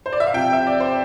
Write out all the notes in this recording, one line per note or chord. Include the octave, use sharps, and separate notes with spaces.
C5
D5
E5
F5
C3 F3 G5
E5
D5
C5